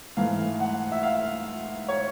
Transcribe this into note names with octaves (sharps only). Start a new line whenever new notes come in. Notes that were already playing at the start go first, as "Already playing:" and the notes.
G#2 E3 A3 F5
F#5
E5
F5
C#5